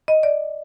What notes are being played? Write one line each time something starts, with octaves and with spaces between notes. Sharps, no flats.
D#5
D5